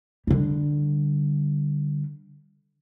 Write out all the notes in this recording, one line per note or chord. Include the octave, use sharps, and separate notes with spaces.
D3 G3